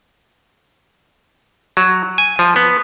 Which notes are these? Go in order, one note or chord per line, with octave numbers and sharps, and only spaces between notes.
F#3
G#5
F3
B3